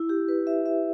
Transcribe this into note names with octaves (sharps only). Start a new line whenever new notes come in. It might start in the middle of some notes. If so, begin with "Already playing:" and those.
Already playing: E4
G4
B4
E5
E5